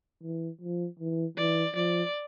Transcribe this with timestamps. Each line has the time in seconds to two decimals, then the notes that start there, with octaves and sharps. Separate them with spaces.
0.23 E3
0.61 F3
0.99 E3
1.37 E3 D5
1.76 F3 D5